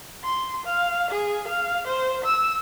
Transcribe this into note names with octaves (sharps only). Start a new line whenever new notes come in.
C6
F5
G#4
F5
C5
E6